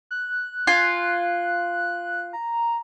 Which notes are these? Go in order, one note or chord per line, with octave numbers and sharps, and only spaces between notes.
F#6
F4 G#5
A#5